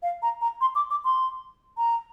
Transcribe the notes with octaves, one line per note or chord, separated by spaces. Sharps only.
F5
A#5
A#5
C6
D6
D6
C6
A#5